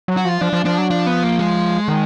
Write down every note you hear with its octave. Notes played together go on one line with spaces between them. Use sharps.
F#3
F#4
F3 F4
F3 D4
F3
F3 D4
F#3
F3 D4
B3
A#3
G#3
D#3